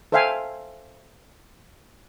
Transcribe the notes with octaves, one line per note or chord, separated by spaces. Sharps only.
A4 C5 E5 F5 G5 G#5